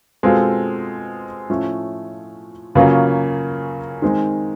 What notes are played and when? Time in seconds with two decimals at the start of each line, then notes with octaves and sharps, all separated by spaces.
0.23 B2 G#3 C4 F4 A4
1.50 A2 F3 A3 C#4
2.75 C#3 F#3 A#3 C#4 F4
4.02 D#3 G#3 C4 D#4